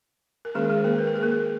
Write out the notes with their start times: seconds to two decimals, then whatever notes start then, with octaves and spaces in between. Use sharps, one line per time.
0.45 A#4
0.55 D#3 G#3 A#3 C#4 G#4
0.70 G#3 G#4
0.84 A#3 A#4
0.98 B4
1.07 A#4
1.16 G#4
1.23 A#3 A#4